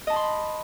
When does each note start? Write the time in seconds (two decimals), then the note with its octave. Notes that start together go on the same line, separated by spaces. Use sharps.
0.07 D#5
0.10 A5
0.13 B5
0.16 C6